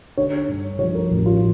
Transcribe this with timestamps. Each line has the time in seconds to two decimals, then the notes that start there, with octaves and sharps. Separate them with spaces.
0.17 D3 C#5
0.48 G2
0.79 F3 C#5
0.95 A#4
1.10 A1
1.26 F4